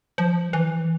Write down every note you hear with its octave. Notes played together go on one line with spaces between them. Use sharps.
F3
E3